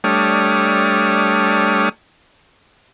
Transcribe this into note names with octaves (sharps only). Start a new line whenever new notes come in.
G3 A3 D4 C#5 D#6 F6